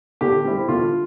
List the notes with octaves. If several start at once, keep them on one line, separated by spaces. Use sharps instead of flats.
D3 G4
G3 C4 E4
D3 F4